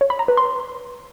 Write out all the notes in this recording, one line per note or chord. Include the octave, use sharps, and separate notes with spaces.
C#5
B5
A#5
B4
C6